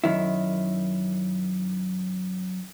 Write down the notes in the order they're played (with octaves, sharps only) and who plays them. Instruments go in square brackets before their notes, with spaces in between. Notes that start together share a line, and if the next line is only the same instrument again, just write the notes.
[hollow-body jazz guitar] F#2 D#3 E4